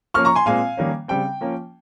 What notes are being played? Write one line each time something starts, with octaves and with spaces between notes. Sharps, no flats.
F3 A#3 C#4 C#6 F6
A#5 C#6
G#5 C6
A#2 G#3 C4 F5 G#5
D#3 G3 A#3 C#4
C#3 G3 C4 G5
F3 A#3 C#4